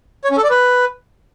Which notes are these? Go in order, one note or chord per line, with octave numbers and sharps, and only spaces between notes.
C#5
C#4
A4
D5
B4